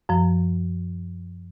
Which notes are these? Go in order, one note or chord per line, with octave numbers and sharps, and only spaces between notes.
F#2 F3